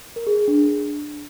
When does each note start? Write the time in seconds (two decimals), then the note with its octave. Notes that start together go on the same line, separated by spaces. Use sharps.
0.16 A#4
0.27 G#4
0.37 G#4
0.48 D4